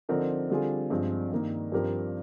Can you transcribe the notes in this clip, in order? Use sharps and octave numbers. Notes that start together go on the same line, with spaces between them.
D3 F3 C4 D#4 A#4
D3 G3 C4 F4 G#4
G2 F3 G#3 C4
G2 D#3 A#3 D#4
G2 F3 C4 G4 A#4